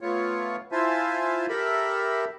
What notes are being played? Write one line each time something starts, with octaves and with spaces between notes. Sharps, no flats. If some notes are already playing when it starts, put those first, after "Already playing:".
A3 B3 F4 C#5
E4 F4 C5 E5 G#5 A5
G4 A4 A#4 E5 B5